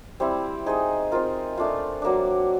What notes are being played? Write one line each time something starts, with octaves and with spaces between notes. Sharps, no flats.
G3 C4 E4
D#4 G#4 C5 D#5
C4 F4 A#4
A3 D4 F4
F#3 A#3 D4